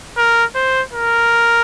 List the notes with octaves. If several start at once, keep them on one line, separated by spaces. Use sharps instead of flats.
A#4
C5
A#4